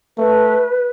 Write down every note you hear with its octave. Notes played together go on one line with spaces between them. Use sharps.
A3 B4